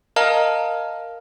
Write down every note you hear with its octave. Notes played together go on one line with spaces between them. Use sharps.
A#4 D#5 F5 A5 A#5 F6